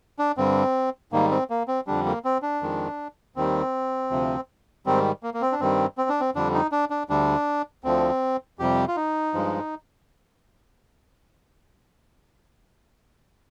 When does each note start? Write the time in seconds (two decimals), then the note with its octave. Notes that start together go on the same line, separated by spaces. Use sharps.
0.19 D4
0.37 G2 D3 G3 C4
1.12 G#2 D#3 G3 A#3
1.31 C4
1.50 A#3
1.68 C4
1.87 F2 D3 G3 D4
2.06 A#3
2.25 C4
2.42 D4
2.62 F2 D#3 G#3
3.36 D#2 D#3 G3 C4
4.10 D2 C3 F3
4.86 G#2 D#3 G3 C4
5.23 A#3
5.34 A#3
5.42 C4
5.52 D4
5.60 G2 D#3 G3 C4
5.98 C4
6.09 D4
6.21 C4
6.35 F2 D3 G3 D4
6.54 D#4
6.72 D4
6.90 D4
7.10 D2 D3 G3 D4
7.84 D2 D3 F3 C4
8.59 F2 C3 G3 G4
8.88 F4
8.96 D#4
9.34 G2 F3 G#3